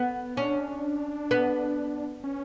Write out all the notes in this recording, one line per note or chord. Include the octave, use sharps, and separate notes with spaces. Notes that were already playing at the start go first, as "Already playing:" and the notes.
Already playing: B3
C#4 D4
B3
C#4